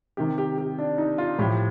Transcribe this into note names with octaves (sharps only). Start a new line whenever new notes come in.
C3 D#3 G4
G4
G4
D4
D#4
F4
A2 F3 G4